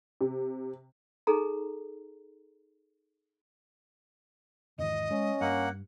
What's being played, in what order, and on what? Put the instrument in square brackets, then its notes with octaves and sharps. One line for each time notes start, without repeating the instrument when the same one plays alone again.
[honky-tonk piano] C3
[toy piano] D#4 G#4 A4 A#5
[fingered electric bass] E2 G#2 D#3 [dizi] D#5
[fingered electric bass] G#3 [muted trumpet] C#4
[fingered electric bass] G2 [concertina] A#3 F#5